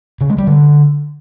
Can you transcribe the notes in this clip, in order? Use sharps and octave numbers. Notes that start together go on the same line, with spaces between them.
C#3
G#3
G3
D3